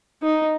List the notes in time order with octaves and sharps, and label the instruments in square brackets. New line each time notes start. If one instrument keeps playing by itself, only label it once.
[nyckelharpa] D#4